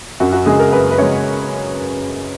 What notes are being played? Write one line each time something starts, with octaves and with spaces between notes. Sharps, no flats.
F#2 F#4
F#4
C#3 G#3 G#4
A#4
F#2 B4
B4
C#3 G#3 C#5